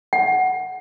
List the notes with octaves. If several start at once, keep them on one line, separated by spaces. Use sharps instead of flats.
F#5